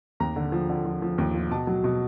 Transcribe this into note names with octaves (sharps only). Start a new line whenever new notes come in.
D#2 A#5
D3
F3
D3
F3
F3
D#2
F3
B2 A5
F#3
B2